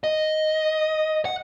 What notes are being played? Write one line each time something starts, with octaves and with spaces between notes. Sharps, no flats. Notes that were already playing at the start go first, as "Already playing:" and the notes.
D#5
F#5